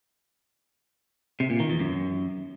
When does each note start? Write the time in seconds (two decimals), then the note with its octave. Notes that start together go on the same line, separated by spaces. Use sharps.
1.40 C3
1.50 A#2
1.60 D#3
1.70 E2
1.80 F#2